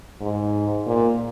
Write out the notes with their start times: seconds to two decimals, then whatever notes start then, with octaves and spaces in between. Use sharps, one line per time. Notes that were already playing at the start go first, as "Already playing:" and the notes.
0.21 G#2
0.86 A#2